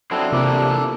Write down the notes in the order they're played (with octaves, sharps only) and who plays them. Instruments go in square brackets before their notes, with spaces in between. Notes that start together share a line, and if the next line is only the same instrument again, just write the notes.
[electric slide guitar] F#3 C4 E4 [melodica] D4 A4
[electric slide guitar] E2 A#3 D5 [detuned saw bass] C3 [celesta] F4 A#4 D6